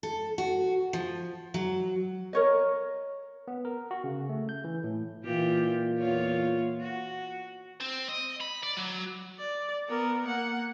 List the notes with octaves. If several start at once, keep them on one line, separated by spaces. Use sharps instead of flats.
A4
F#4
F3
F#3
A#4 C#5 D#5
B3
A#4
F#4
C#3
A3
G6
E3
A2
A#2 E3 F4 G4
E2 F4 C#5
F#4
C4
D#5
B5
D5
F#3
D5
B3 A#4
A#3 F#5